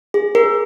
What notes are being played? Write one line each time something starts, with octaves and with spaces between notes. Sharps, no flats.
G#4
G#4 A#4